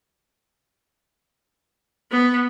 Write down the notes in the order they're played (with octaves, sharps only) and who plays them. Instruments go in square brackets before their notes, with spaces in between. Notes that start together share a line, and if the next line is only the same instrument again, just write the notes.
[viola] B3